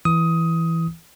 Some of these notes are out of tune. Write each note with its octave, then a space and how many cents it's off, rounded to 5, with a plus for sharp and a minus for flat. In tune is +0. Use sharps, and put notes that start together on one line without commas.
E3 +0 D#6 +15